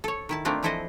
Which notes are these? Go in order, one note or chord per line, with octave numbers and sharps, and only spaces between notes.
A4 C#5
D#3 E4 A5
A3 A#3 C4 D4 F4
E3 F3 E4 A4 C5 D#5